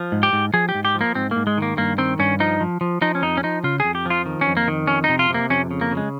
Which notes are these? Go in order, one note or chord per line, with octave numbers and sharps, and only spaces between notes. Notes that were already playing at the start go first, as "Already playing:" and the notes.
Already playing: F3
G#2
G4
G#2
F3 G#4
G4
G#2
G4
F3
A#3
G#2 C4
G#2 A#3
G#3
D#3 A#3
G2 A#3
D#3 C4
G2 C#4
F3 D#4
F3
F3
F3 D#4
C#4
F2 D#4
C#4
F3 D#4
C#3 F4
F2 G#4
G4
F3 F4
D#3
C#4
F2
A#3
D#3
F2 C#4
D#4
C3
F4
C3 A#3
F2 C#4
C#3
A#3
C#3
G#3